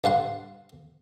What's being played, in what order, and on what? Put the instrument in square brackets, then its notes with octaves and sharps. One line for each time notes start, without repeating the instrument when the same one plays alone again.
[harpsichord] G2 F5 F#5 C6